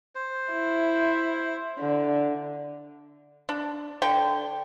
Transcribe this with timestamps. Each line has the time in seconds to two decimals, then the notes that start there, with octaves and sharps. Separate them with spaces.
0.15 C5
0.52 E4
1.79 D3
3.49 D4
4.02 D3 G5